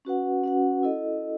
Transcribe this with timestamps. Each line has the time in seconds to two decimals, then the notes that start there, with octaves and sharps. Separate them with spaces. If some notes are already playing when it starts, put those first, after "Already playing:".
0.05 C#4 F#4 B4 F#5
0.44 C#4 F#4 B4 F#5
0.83 E4 A4 D#5